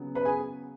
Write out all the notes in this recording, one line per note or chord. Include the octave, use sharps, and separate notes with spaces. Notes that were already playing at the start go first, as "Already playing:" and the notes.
Already playing: C#3 F#3 B3
B4 B5
G#4 G#5